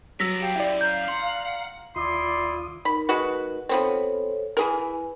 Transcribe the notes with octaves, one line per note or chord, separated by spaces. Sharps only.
F#3 B3 D4 E6 A#6 B6
G4 F5
F#2 E4 D5
F5 A#5 G6
F#5 C6
D#2 E4 F4 D5 C6 D#6
D#4 A#4 B5
G#3 F#4 B4
F3 B3 C4 A4 C5 C#5
E3 E4 G#4 A#4 B4 G#5